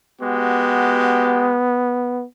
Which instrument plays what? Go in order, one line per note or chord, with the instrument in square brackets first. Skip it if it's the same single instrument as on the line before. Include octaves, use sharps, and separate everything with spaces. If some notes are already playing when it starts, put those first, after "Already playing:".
[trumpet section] G#3 F#4 G4 [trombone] B3